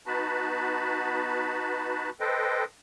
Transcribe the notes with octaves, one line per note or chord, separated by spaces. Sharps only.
B3 D#4 F#4 B4 A5 B5
A4 B4 C5 D#5 G5